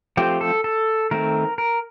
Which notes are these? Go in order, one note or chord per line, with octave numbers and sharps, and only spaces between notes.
F3 A3 C4 G4
A4
A4
D#3 A3 C4 A#4
A#4